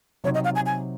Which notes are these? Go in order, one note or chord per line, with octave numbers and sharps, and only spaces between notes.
C3 F#3 C4 D#4 C#5
D#5
F5
G#5
G#5